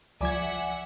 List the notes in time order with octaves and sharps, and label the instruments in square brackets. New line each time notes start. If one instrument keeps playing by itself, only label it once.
[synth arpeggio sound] C#2 F3 G#6 [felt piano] D5 G#5 D6 [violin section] E5 F#5